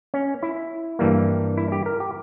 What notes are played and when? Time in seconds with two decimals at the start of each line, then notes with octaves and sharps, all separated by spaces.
0.14 C#4
0.43 E4
0.99 G2 E3 G3 A#3
1.57 E4
1.72 G4
1.86 A#4
2.00 G4